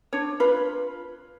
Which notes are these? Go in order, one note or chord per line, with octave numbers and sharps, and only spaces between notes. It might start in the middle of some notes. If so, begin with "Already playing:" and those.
D4 C#5
F4 B4